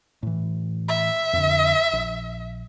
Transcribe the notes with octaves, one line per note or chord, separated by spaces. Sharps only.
A2 E3
E5
F2 D3
A#1